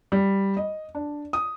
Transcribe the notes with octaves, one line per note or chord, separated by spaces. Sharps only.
G3
D#5
D4
D#6